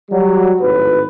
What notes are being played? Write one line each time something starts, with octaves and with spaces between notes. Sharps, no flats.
F#3 G3
G#1 A2 B4